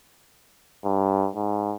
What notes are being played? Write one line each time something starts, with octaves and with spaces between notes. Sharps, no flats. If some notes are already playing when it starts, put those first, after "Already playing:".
G2
G#2